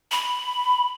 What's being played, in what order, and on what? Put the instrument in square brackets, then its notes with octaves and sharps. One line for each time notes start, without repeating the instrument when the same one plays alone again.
[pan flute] B5